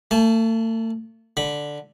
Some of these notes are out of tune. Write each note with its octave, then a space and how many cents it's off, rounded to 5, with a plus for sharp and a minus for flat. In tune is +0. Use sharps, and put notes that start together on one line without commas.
A3 +40 A5 -25
D3 +0 B5 -10